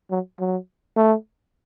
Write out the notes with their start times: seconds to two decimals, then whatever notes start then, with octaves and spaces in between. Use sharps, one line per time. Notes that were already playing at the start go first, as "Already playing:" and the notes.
0.11 F#3
0.39 F#3
0.96 A3